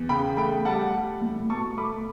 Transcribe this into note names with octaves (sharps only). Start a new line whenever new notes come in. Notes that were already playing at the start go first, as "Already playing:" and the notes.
Already playing: E2
C#3 G5 B5
A3 G5 B5
G3 F#5 A5
G3
A2
B2 A5 C#6
A3 B5 D6